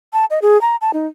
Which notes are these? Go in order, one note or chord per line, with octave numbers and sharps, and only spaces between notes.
A5
D#5
G#4
A#5
A5
D#4